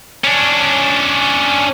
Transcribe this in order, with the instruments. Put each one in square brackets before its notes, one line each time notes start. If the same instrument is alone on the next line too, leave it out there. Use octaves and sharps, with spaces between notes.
[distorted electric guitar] C#4 D4